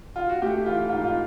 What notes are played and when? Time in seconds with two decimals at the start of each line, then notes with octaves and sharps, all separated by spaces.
0.16 F4
0.29 F#4
0.42 A3 G4
0.66 E3 F4
0.89 G#2 F4
1.04 F4